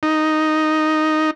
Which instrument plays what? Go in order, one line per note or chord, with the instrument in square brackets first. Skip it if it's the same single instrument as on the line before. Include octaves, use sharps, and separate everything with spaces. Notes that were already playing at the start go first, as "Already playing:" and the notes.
[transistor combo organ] D#4